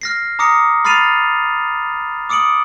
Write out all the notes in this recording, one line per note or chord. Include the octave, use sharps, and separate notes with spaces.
F6 A#6 C7
A#5 D6 D#6 A#6 C#7
B5 F6 A6 C7 D#7 F7
D6 D#6 C#7 D7 F#7